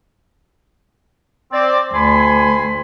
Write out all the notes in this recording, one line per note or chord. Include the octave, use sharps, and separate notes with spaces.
C4 D5
D2 G#5 B5 C6